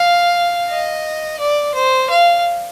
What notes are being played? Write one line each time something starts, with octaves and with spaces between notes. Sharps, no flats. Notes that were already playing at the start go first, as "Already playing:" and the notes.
Already playing: F5
D#5
D5
C5
F5